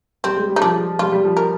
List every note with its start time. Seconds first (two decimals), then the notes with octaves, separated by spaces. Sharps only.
0.24 G3 C4
0.37 G#3
0.49 G3
0.56 D#4
0.62 F3 D4
0.99 G3 F4
1.12 G3
1.25 F3
1.37 A#4